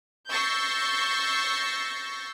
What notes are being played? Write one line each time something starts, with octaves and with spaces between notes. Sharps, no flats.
C#6 E6 G6 A6 A#6 C7